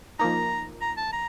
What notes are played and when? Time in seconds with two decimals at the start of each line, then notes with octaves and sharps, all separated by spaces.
0.19 F3 A#3 D#4 A#5
0.81 A#5
0.97 A5
1.12 A#5